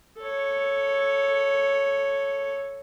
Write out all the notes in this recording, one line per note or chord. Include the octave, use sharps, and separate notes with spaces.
A4 C#5